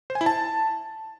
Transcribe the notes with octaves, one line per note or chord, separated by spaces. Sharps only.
C5
G#5
E4
A5